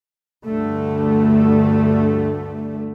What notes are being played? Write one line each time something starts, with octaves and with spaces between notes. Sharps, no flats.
D2 G2 D3 A3